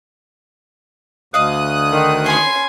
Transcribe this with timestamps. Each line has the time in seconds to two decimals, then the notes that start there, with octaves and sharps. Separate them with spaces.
1.34 D2 D#5 F5 D#6 F#6
1.92 D#3
2.26 C#4 G#5 B5 C6 C7